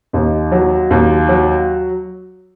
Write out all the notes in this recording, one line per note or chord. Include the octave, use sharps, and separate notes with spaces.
D#2 D#5
F#3
D#2
F#3